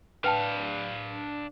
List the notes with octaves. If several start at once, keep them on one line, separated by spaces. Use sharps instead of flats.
D4 B4 F5 G5 A5